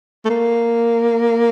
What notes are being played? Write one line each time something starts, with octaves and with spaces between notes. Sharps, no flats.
A3
A#3